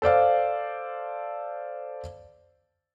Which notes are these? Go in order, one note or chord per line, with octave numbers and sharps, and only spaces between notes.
A4 C5 D5 F5